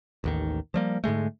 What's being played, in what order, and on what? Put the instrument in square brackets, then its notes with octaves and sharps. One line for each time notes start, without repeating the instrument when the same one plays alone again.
[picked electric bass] A1 D#2 D#3
F3 G3 A#3
G#2 D3 G#3 A3